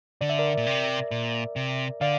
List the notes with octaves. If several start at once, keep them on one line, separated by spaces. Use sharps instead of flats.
D3 D5
E5
A#4 D5
A#2
C3
A#2
C3
D3 D5 F5